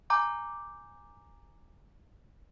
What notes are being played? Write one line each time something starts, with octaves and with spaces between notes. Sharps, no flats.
G#5 A#5 D6 G6